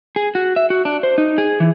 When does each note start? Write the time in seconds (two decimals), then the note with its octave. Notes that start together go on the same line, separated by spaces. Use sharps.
0.16 G#4
0.35 F#4
0.56 E5
0.70 F#4
0.85 D4
1.03 C5
1.18 D#4
1.38 G#4
1.60 E3